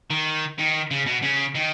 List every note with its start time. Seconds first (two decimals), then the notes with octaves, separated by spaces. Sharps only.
0.10 D#3
0.58 D#3
0.91 C#3
1.06 B2
1.23 C#3
1.55 D#3